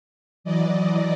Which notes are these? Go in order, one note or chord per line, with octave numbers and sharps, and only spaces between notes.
E3 F#3 D5 D#5